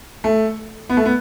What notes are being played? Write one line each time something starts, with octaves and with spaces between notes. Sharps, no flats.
A3
B3
A3
B3